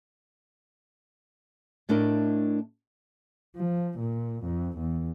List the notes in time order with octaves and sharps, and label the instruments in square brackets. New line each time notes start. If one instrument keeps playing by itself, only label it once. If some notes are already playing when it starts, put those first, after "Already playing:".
[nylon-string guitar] A2 A3 D4 E4 A#4 D#5
[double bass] F3
A#2
F2
E2